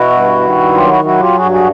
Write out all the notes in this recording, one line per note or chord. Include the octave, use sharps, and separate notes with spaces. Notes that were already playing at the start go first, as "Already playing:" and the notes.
Already playing: B2 E4 F#4
G2
D#3
F#3 F4 G4
E4 F#4
F#3 E4 F#4
F4 G4
G2 F#4 G#4
F#4 G#4